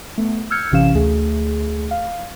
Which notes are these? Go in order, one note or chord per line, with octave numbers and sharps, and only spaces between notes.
A3 B3
E6 F6 G6 G#6 C#7
A1 C3 E3 C#4 F5 E7
D2 A3 G#4
F5